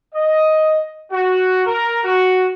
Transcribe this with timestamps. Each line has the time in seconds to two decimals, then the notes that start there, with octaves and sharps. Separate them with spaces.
0.15 D#5
1.11 F#4
1.66 A#4
2.04 F#4